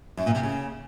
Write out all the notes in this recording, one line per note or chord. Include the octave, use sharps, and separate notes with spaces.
F#2
A#2
C3
C#3